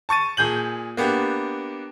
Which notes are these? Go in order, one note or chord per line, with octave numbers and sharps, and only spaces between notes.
A5 C#6 A6 D#7
A#2 G#4 G6 F#7
A#3 B3 D4 G4